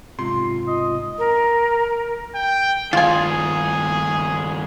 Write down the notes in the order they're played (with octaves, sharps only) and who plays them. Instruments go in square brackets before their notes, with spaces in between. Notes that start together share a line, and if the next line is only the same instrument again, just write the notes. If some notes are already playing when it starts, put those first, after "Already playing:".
[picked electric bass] B1 G#2 C3 [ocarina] F4 [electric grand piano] C6
[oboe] D#5
[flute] A#4
[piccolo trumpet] G5
[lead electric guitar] G2 D#3 [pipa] F4 G#5 [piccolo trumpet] G#4